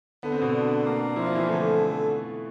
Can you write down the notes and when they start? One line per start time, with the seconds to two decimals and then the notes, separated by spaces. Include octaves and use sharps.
0.23 D3 B3
0.32 C4
0.42 B2 B3
0.54 D4
0.85 A#3
1.16 F3 E4
1.26 F4
1.35 E3 E4
1.47 D3 A3 A4